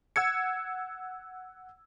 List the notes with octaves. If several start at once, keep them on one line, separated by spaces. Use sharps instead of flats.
F#5 E6 G#6 C#7